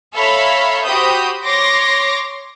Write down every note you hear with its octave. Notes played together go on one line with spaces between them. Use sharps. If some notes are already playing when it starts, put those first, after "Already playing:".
A4 C#5 E5 F5 A#5 B5
F#4 G4 C5 B5 D#6 G6
C#5 C6 D6 A#6